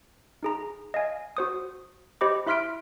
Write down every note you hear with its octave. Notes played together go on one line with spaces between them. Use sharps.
D#4 G#4 A#5
D#5 F5 G#5
F#4 C5 D#6
G4 C5 D#5 B5 D6
E4 E5 C6 F6 B6 D7